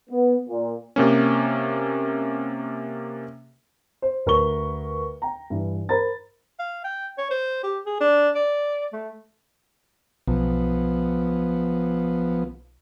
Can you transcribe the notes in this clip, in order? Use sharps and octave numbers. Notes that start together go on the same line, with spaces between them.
B3
A#2
C3 A#3 C#4
C5
D2 A#4 B4 C#6 G7
G5 A#5
G2 E3
A#4 C5 A#5 B5 A6
F5
G5
C#5
C5
G4
G#4
D4
D5
A3
B1 F3 B3